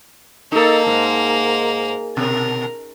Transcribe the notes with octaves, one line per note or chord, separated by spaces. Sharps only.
A#3 D#4 A4 A#4
G#2
B2 A#4